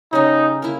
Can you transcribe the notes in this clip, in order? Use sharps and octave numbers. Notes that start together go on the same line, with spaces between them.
C#3 G3 C#4 D#4
A#3 E4 A#4